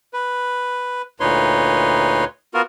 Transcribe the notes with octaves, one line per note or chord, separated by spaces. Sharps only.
B4
D2 A#2 D#4 B4 C#5 C6
B3 F4 F#4 A#4